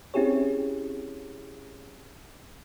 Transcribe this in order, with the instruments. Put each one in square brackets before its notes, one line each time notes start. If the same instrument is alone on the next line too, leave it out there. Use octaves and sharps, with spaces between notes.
[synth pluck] C4 C#4 E4 G4 G#4 C#5